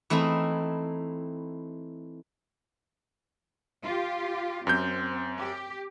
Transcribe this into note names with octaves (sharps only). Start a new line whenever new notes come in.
E3 A3 C4 D#4 E4
F4 G4
F#2 C4 G6
G4